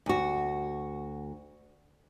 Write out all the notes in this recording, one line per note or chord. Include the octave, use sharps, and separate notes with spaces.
D2 F#4